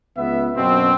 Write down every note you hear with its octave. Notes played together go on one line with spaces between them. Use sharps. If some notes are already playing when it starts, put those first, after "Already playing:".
C#2 B3 E5
F#2 B2 C4